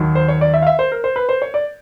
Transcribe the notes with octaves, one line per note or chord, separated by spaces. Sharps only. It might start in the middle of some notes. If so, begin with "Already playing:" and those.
Already playing: D#2 D#3 F#3
C5
C#5
D5
E5
F5
E5
C5
A#4
C5
B4
C5
C#5
D5